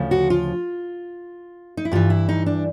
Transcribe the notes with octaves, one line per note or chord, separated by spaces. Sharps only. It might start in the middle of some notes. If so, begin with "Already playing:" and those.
Already playing: D2 C#3 F3
F#4
F4
D#4
E4
G2 E3 F4
E4
D#4
D4